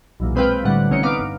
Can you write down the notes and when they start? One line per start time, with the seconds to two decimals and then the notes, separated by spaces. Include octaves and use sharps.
0.20 B1 E2 A#2
0.35 G#3 C4 B4 C5 F5 G5
0.63 A2 D3 G3 F#5
0.90 A1 C3 C#4 D#4 C#7
1.03 B3 F5 A#5 D6 D7
1.18 G1